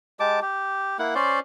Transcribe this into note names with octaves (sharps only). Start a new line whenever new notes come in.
G#3 G4 A5 D6
G4
A#3 E4 F#5
C#4 C5 D5 C6